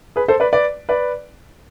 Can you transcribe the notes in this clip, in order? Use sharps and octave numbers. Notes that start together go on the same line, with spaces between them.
G#4 B4
A4 C5
B4 D5
B4 D5
B4 D5